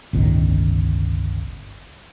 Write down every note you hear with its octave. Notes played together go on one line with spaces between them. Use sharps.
G1 C#2 A2 D#3